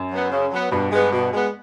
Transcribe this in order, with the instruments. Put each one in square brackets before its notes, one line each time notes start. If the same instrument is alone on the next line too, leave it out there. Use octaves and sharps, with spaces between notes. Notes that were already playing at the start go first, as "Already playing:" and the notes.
Already playing: [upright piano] F#2
[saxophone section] F#3 B3
C#3
F#3 B3
[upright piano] G2 [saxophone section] B2
[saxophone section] G#3 B3
B2
G#3 B3